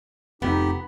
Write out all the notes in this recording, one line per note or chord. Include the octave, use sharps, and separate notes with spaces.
F1 F2 B3 D#4 G4